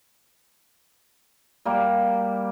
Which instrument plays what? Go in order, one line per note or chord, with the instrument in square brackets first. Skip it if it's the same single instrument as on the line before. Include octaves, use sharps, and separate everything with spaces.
[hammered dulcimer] G3 A#3